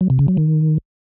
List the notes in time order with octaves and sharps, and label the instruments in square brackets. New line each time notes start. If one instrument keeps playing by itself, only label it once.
[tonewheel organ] F#3
C3
C#3
F#3
D#3